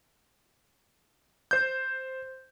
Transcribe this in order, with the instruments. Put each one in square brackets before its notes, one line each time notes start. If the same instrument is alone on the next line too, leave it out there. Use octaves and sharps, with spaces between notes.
[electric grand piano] C5 G6